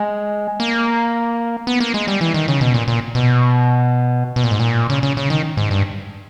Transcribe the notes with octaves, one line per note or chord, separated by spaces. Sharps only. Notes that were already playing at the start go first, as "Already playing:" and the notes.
Already playing: G#3
A#3
B3
A#3
G#3
G3
E3
D#3
C#3
B2
A#2
A#2
B2
B2
A#2
G#2
A#2
C#3
C#3
C#3
D#3
G#2
G2